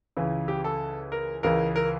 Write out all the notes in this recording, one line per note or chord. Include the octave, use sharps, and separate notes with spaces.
C#2 C#3 E3
G4
A4
A#4
C#2 C#3 E3 A#4
A#4